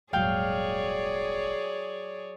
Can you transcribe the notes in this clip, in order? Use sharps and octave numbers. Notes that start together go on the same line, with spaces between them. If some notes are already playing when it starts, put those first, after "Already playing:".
D#1 G#1 F#3 G#4 C#5 D5 F5 G5